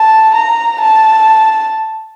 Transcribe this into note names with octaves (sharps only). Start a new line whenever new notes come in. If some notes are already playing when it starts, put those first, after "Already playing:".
Already playing: A5
A#5
A5